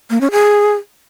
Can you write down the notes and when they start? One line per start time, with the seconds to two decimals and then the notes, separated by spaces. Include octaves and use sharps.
0.10 A#3
0.21 C#4
0.31 G#4